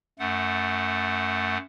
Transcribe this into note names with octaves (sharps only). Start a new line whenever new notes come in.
F#2 A3 F#5